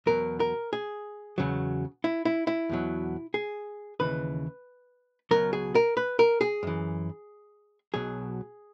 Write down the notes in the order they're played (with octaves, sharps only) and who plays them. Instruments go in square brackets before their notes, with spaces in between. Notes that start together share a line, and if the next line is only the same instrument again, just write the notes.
[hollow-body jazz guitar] E2 B2 F#3 A#4
A#4
G#4
E2 C#3 F#3
E4
E4
E4
E2 B2 F#3
G#4
D#2 C#3 E3 B4
C#2 B2 F#3 A#4
G#4
A#4
B4
A#4
G#4
F#2 E3
B1 B2 F#3 G#4